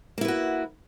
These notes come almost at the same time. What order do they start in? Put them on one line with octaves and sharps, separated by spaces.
A#3 E4 B4 F#4